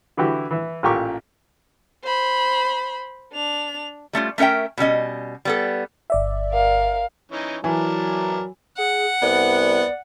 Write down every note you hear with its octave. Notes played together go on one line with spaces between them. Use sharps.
D3 E3 E4 F#4 G4
E3 E5
A1 A#2 G4 A#4 C#6 D6
C5 B5
D4 F7
G3 A3 C#4 F4
A3 C#4 A#4 E5 G5
B2 G3 C#4 D#5
G3 B3 A4
G1 D5 E5
A#4 F5
E3 C#4 D#4
E3 F#3 A#4 D5 A5
G#4 F#5
C2 B3 D5